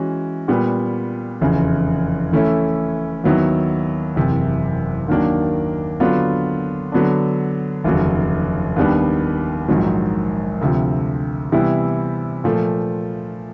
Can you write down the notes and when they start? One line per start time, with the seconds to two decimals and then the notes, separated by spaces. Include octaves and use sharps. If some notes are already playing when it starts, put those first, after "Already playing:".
Already playing: E3 G#3 C#4 F#4
0.48 A#2 G3 B3
1.41 F1 E2 C#3
2.32 E3 A3 C#4 E4
3.24 D#2 D#3 F#3 B3 E4
4.16 F#1 E2 C3
5.08 D#2 D#3 F#3 A#3 D4
6.00 D3 F#3 B3 D4 F4
6.92 D3 F#3 B3 D4
7.84 F1 D#2 C#3 F#3
8.76 D#2 D#3 G3 B3 D4
9.68 A#1 G#2 D#3 F#3
10.61 D2 C3 F3
11.52 C3 E3 G3 B3 E4
12.44 A#2 F3 A3